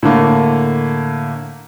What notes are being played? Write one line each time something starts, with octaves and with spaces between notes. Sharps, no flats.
A2 D3 A#3